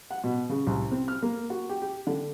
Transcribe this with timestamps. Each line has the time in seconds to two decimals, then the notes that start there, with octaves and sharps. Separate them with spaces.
0.11 F#5
0.24 B2
0.49 C#3
0.67 C2
0.91 C4
1.08 F6
1.23 A#3
1.50 F#4
1.69 G4
1.82 G4
2.07 D3